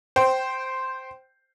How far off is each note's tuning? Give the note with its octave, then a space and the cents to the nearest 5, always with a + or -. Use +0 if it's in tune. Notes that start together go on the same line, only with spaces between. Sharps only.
C5 +0 G5 -15